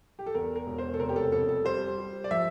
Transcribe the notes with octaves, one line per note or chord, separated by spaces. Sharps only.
G4
A4
E2 A#4
A#4
E1
C5
A4
F1 A#4
G4
A4
F2 A4
A4
G3 C5
G3
D5
F3 E5